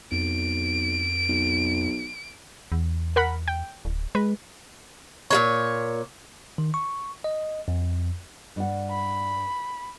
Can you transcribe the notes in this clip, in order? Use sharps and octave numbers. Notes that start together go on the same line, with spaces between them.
B1 F2 D7
B1
E2
A#4 F#5 B5
G5
D1
G#3 B4
A#2 G#3 C#5
D#3
C#6
D#5
F2
G2 D5 F#5
B5